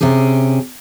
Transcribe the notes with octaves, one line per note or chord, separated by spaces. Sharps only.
C3 C#4 G4 G#4